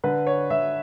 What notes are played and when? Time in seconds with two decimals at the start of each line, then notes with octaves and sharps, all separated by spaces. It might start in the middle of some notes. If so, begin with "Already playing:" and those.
0.04 D3 B4
0.27 C#5
0.50 D3 E5